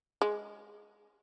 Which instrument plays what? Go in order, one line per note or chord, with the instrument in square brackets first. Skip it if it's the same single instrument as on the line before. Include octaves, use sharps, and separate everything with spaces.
[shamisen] G#3